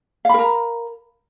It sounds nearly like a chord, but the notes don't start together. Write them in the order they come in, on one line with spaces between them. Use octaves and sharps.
F5 B5 A#4 A#5